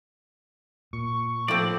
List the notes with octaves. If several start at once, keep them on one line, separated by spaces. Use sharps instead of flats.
A#2 C#6
A2 F3 C4 D5